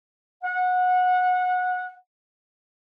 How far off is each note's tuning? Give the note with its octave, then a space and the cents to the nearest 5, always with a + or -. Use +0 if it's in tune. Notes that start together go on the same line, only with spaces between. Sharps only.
F#5 -20